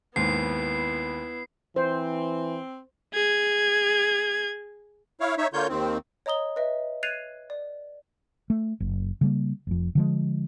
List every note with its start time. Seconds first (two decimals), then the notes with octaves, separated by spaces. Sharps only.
0.16 D#2 G#2 B3 E4 C7
1.76 E3 C4 C5
3.14 G#4 G#6
5.21 E4 C#5 F5
5.38 D#4 C#5 E5
5.53 D3 A#3 F4 C#5 G6
5.69 D#2 D#3 C4
6.26 C#5 D#5 A#5 D#6 G7
6.56 B4 D#5 E5
7.03 F#6 G#6 A6 C7 D#7 F7
7.50 D5
8.50 A3
8.80 F#1
9.21 C#3 G3 A#3
9.67 F1 F2
9.95 D3 F3 G#3